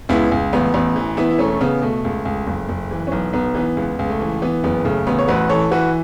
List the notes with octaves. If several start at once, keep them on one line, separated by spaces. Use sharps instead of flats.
C#2 B3 E4
C#2
A1 B3
A1 B3
E3
E3 B3 E4
E4
E1 A3 C#4
C#3 B3
B2 A3
C#2
C#2
F#1
F#1
E3
C#4
B1 B3
B1 B3
E3 B3
C#2 B3
C#2
A3
E3
E3 B3
F#1 B3
C#3 A3
A1 B3
C#5
A1 F#4 B4
E3 A4 C#5
E3 F#4 B4